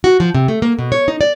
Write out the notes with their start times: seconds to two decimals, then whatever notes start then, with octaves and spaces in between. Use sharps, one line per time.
0.04 F#4
0.20 F3
0.35 C3
0.48 A3
0.62 A#3
0.79 B2
0.92 C#5
1.08 D#4
1.21 D5